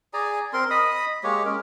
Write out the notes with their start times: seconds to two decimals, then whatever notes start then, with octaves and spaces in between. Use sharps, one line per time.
0.13 G#4 D5 G#5 A#5
0.53 C4 A#4 C6
0.70 D#5 B5 D#6
1.23 G#3 A#3 G4 C#5
1.45 G#3 C#4 A#4